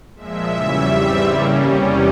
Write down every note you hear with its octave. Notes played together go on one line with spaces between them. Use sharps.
A#2 F3 G#3 E5
E2 C#3 G3 C#4 E5
G#2 E3 G3 C4 E5
C#3 G3 A#3 C#4
E2 C3 G3 C#4